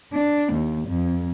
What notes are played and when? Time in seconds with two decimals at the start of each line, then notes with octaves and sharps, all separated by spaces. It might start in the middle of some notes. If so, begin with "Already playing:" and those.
0.14 D4
0.53 D#2
0.88 F2